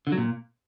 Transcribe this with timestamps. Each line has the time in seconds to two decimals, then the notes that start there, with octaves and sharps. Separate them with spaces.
0.07 D3
0.12 F#3
0.18 A#2